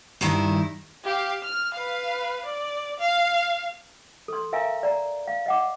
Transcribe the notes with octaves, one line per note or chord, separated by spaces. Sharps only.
G2 D#3 E4
G4 F5
F6
B4 F5
D5
F5
A4 C6
A#4 E5 F5 G#5 A#5
D5 A#5
F5
D#5 F#5 D6